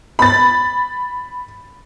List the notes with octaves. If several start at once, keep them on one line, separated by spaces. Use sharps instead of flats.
B5 A6